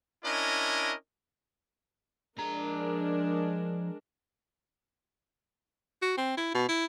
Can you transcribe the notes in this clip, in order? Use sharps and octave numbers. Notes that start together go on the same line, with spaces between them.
C#4 D4 E4 A#4 D#5
F3 G#3 D4 A#4 A#5
F#4
C4
E4
B2
E4